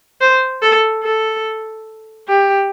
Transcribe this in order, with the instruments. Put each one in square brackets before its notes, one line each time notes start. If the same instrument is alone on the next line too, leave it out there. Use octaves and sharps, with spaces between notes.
[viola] C5
A4
A4
G4